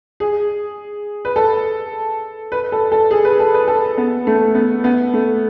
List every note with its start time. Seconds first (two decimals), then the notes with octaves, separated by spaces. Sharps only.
0.20 G#4
1.25 B4
1.36 A4
2.52 B4
2.72 A4
2.92 A4
3.11 G#4
3.25 B4
3.39 A4
3.54 B4
3.68 A4
3.98 B3
4.27 A3
4.55 B3
4.84 B3
5.13 A3